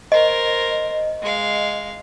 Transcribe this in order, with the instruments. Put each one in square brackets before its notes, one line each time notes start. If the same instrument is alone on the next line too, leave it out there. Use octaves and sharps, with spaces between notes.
[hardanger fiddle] A#4 C5 [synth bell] D#5
[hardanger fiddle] G#3 F5